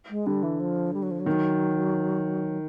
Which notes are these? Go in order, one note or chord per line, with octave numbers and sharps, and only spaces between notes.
G#3
D3 G3
E3
F3
G3
F#3
F3
F#3
D#3